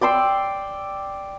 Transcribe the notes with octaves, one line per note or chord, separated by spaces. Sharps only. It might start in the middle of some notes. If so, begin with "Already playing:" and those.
D5 G5 C6 E6